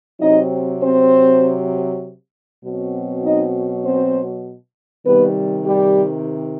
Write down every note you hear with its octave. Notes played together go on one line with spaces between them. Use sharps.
C3 F#3 C4 D#4 D#5
C4 C5
B2 F#3 C4
D#4 D#5
C4 C5
C3 D#3 G3 B3 B4
G3 G4